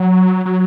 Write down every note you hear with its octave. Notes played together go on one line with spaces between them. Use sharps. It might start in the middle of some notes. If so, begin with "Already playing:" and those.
Already playing: F#3
F#3